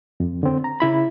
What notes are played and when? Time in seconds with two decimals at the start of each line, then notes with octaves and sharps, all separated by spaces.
0.20 F2
0.43 D3 C4
0.64 A#5
0.80 C#3 E4 B5